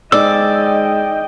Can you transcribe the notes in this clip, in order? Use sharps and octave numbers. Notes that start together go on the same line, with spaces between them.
G#2 D5 D#5 G5 E6